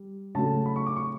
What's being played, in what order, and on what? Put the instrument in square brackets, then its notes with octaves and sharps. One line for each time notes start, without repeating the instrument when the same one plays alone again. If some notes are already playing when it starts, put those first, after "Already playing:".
Already playing: [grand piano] G3
C#3 F#3 A3 A5
B5
C#6
D6
C#6